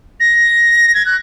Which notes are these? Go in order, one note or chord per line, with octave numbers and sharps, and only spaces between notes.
A#6
G#6
F#6